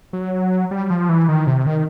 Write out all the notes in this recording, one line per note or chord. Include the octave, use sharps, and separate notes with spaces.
F#3
G3
F3
E3
D#3
C3
D#3